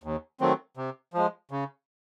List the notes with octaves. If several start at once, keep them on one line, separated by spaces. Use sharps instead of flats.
D#2
D#3 F#3 A3 C4
C3
F3 G#3
C#3